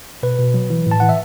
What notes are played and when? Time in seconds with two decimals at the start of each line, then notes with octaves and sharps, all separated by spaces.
0.23 B2 B4
0.39 B2
0.54 F#3
0.70 E3
0.86 A2
0.91 A5
1.00 E3 F#5
1.09 E5